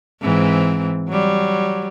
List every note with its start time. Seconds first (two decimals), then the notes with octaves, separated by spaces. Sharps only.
0.22 G#2 E3 C4
1.08 F#3 G3